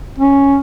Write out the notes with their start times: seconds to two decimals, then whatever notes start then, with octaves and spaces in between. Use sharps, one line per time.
0.19 C#4